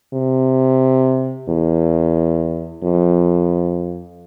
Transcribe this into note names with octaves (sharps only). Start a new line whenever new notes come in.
C3
E2
F2